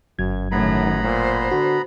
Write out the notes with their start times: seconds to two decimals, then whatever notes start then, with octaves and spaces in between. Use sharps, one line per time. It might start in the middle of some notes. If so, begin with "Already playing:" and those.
0.19 G1 F#2 F#3 G#6
0.52 F#2 A2 D#3 B3 A#5 B5
1.04 A#2 C5
1.51 D3 F#4